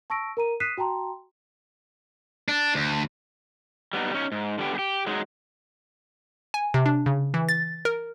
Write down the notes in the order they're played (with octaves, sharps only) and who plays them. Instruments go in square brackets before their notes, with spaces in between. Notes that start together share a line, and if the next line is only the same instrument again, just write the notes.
[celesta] A5 C#6 E6 A#6 D7
A#4 A#5 D#7
D#6 F#6 B6 C7 D#7 E7
F#4 G5 A5 A#5 C6
[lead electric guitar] D4
D2
[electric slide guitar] G3 B3 C#4 D#4
C#4 D#4
G#2
D3 G3 B3 G4
G4 G#4
F#3 G#3 D#4
[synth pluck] G#5
C3
D4
C#3
E3
A6
A#4